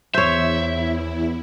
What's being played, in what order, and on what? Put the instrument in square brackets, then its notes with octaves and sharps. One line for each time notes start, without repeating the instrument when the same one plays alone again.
[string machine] E2 E4 [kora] C5 C#5 [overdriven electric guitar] E5